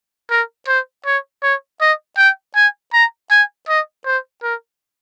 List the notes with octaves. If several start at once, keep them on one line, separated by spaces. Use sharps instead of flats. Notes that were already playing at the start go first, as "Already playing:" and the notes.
A#4
C5
C#5
C#5
D#5
G5
G#5
A#5
G#5
D#5
C5
A#4